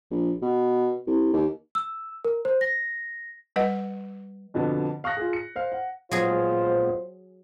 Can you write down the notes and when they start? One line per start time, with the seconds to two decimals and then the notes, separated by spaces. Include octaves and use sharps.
0.11 A#1
0.42 B2
1.07 C2
1.33 D#2
1.75 E6
2.25 A#4
2.45 C5
2.61 A#6
3.56 G3 B4 D#5 F#5
4.54 F2 B2 D3 B3
5.04 F5 C#6 D#6 F#6 A#6
5.17 F4 G#4
5.33 C#7
5.56 C5 F5
5.72 F#5
6.11 A#2 F#3 G#3 B3 F4 G#4 C5